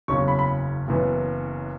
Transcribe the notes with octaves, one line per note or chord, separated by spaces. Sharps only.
F#1 E2 C#3 F#3 C#4 C#6
B5
B5
F#1 F#2 E3 B3